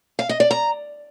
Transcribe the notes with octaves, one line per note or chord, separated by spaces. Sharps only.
F5
D#5
D5
A#5